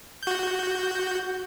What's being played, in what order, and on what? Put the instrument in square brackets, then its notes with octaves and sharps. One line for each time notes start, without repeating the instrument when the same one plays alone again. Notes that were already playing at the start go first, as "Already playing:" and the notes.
[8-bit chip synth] F#4 G6